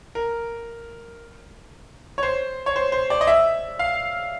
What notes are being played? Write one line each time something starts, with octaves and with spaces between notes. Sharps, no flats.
A#4
C#5
C5
C#5
C5
C5
D5
D#5
E5
F5